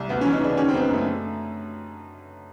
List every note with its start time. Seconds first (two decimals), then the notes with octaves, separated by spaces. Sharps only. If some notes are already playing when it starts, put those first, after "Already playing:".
Already playing: C2
0.09 D2 B3
0.21 C#4
0.25 E3
0.33 D#4
0.41 C#3 D4
0.57 D#3 C#4
0.69 C4
0.73 F#2 B3
0.80 A#3
0.89 F#2 A3
1.04 D3